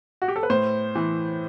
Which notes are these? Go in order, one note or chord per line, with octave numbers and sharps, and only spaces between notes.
F#4
G4
A4
B4
A2 C5
E3